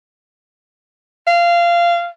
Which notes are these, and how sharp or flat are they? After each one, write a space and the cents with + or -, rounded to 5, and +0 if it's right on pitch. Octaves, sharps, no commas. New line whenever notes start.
F5 -20